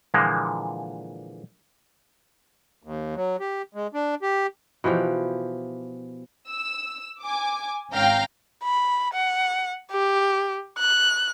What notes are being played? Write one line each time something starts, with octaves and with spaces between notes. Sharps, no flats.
A#2 D3 E3 F3 G#3 A#3
D#2
F#3
G4
G#3
D4
G4
B2 E3 F3 G4
E6
G#5 D6
G#1 C#4 F5 G5 A#5
B5
F#5
G4
F#6